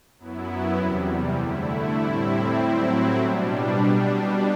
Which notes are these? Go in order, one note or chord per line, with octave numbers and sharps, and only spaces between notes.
F#2 F#3 B3 E4
E2 C3 G3
D3 A3 E4
A2 G3 C4 E4
A2 F#3 C4 E4
B2 G3 D4